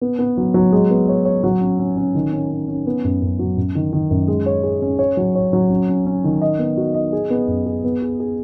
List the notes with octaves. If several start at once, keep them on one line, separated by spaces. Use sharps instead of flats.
B3
B3
F#3
F#3
G#3
B3
C#5
C#5
F#3
C#4
C#4
C#4
D#3
C#4
C#4
C#4
B3
F#2
F#2
F#3
F#2
D#3
D#3
F#2
G#3
C#5
G#4
C#4
C#5
F#3
C#5
F#3
C#4
C#4
C#4
D#3
D#5
B3
F#4
D#5
G#4
B3
F#2
G#4
B3
G#4
G#4